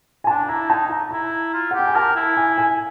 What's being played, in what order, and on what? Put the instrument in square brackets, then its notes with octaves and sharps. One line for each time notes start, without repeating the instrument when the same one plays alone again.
[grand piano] G#5
[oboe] D4 [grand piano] A5
[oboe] E4 [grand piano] A#5
[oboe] D#4 [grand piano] A5
[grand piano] A#5
[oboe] E4 [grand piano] A#5
[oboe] F4
[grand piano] F#5
[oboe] G4 [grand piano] G5
[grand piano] G#5
[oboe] A#4 [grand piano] A5
[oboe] E4
[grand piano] G#5
G#5